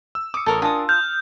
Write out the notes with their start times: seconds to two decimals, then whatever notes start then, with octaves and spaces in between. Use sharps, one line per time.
0.15 E6
0.34 D6 D#6 C#7
0.46 A1 A4 A#4 C#5
0.62 D4 F4 A#4 G#5 A5 D#6
0.89 F6 G6